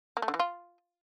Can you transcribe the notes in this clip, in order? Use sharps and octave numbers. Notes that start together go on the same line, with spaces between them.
A#3
A3
D3
E3
F4